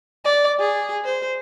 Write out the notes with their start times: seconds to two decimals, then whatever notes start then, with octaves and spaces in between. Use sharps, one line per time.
0.25 D5
0.59 G#4
1.05 C5